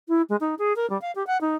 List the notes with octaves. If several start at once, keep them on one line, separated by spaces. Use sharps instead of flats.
E4
G#3
D#4
G#4
A#4
G3
F5
G4
F#5
D#4